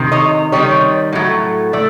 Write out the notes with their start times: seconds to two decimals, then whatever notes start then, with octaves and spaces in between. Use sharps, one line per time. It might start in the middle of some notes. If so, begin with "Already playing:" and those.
Already playing: C3 D#3
0.12 C#5 D#5
0.52 C3 D#3 G3 C#5 D#5
1.13 A2 F#3 A3
1.73 A3 D5